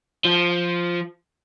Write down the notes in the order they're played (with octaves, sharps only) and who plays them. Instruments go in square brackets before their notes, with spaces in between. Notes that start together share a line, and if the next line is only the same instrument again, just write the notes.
[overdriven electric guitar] F3